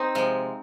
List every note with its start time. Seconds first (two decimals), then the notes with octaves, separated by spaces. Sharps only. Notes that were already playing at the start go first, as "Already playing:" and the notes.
Already playing: C4 D#4
0.15 C3 F3 G#3